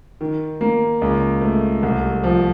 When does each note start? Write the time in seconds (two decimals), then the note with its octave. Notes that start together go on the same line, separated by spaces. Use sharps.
0.21 D#3
0.61 A#3
1.02 C#2
1.42 A3
1.83 C2
2.24 F3